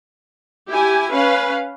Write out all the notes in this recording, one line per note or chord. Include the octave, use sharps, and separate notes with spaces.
E4 G4 G#5
C#4 B4 F5